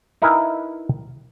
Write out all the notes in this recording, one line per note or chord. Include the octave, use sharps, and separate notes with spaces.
D#4 E4 A#4 B4 F5 G#5